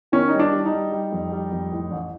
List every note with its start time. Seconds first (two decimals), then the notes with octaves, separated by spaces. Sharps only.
0.12 D#3 C#4
0.28 D#4
0.33 G3
0.39 D4
0.53 G3
0.66 D#4
0.72 G3
0.92 G3
1.12 F2
1.32 G3
1.52 F2
1.72 A2
1.91 A1